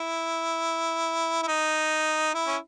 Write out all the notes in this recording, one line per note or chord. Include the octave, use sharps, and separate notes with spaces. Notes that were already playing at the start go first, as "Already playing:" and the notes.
Already playing: E4
E4
D#4
E4
C#4